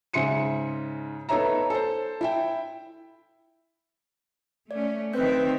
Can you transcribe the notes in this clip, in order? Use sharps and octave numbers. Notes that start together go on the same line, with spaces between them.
G#2 C#3 E5 C6 C#7 D#7
B3 D#4 A4 C#5 E5 A#5
A4 C5
E4 E5 G5
A3 C#4 D5
D#3 C4 B4 E5 G6